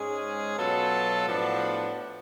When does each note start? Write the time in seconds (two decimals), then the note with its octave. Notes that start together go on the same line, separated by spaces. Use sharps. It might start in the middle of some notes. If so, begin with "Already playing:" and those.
Already playing: G#2 G#3 C#4 G#4
0.57 B2 F#3 B3 F4 A4
1.26 A2 F3 B3 D4 F#4